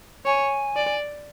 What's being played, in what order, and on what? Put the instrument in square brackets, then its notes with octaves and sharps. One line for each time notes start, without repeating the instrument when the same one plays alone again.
[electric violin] C#5 [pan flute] G#5
[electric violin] D5